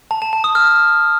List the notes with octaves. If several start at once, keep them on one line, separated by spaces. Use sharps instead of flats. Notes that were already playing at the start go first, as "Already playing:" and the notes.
A5
A5
A5
D#6
F6